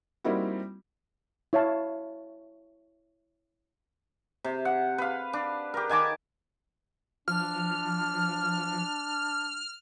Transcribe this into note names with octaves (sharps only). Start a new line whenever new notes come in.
G3 A#3 C4 D#4 E4 F#4
E4 C#5 F5 A5
C3
F#5
B4 F5
D4
G4 A#4
D#3 G#5 A5 D6
F3 D4 F6